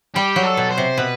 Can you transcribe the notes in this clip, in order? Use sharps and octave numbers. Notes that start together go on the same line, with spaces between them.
G3 G4
F#3
A4
B2
C5
C3
B2 B4